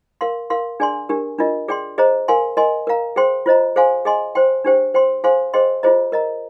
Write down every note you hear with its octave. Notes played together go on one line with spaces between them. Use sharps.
A#4 F5 C6
A#4 F5 C6
D4 G#4 D5 G#5 C6
D4 G4 A#4
D4 F4 A#4 D#5
G#4 D5 G5 C6
G#4 C5 D#5 A#5
A#4 F5 G#5 C6
A#4 D#5 G#5 C6
A#4 F5 A#5
G#4 C5 G5 C6
F4 C5 D#5 A#5
G#4 C5 F5 G#5 C6
G#4 D#5 G#5 C6
C5 G5 C6
D4 G4 C5 G5
C5 G5 C6
G#4 C5 F5 G#5 C6
G#4 C5 D#5 G5 C6
F4 G#4 C5 D#5 A#5
A#4 D#5 A#5